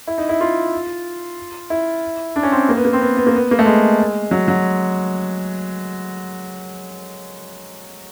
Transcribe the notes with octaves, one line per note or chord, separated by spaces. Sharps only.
E4
D#4
E4
F4
E4
D4
C#4
C4
A#3
B3
A#3
C4
B3
B3
A#3
B3
A#3
A3
G#3
F#3
F#3